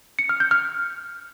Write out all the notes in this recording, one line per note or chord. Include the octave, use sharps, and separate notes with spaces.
C#7
F6
G6
F6